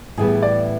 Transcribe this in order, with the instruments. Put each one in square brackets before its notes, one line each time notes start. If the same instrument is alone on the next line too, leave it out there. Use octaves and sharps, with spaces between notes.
[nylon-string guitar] A2 E3 G3 B3 [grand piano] G#4
[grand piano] D5